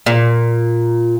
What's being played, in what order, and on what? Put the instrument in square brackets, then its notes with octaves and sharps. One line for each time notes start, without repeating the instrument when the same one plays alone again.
[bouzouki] A#2